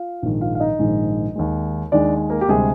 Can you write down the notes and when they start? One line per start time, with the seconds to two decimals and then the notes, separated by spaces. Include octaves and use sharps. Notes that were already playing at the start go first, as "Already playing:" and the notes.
Already playing: F4 F5
0.22 A#1 G#2 D#3 G#3
0.41 F4 F5
0.55 F5
0.60 D#4 D#5
0.79 A#1 G#2 D#3 G#3
1.35 D#2 D#3 G#3
1.92 D#2 D#3 G#3 D4 D5
2.30 A#3 A#4
2.41 G4
2.49 D2 C3 G3 G#3 G#4